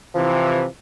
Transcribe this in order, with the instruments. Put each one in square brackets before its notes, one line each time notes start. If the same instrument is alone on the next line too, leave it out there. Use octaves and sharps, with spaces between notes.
[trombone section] C3 E3 [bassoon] F3